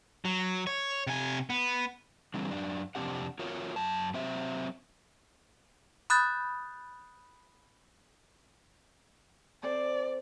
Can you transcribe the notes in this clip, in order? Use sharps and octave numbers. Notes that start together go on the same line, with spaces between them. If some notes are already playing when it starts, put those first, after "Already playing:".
F#3
C#5
C3 G#5
B3
D3 E3 G3 C4
F#2 D4
F2 C3 C4 D4 G4 F#5
F4 F#4 A#4 C#5
F#2 A5
F#3 C4 C5 E5
B5 D#6 F#6 G6 A6
C4 A4 C5 D5